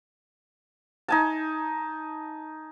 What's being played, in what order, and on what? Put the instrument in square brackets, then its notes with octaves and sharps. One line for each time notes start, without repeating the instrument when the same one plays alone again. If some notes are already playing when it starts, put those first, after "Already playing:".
[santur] D#4 G#5 A5